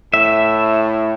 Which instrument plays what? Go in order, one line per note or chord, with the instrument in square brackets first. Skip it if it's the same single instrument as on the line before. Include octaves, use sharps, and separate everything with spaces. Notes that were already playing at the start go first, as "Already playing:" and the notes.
[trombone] A2 [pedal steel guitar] E5